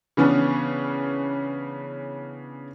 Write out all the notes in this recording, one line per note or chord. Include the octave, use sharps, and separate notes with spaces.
C#3 E3 B3 C#4 D4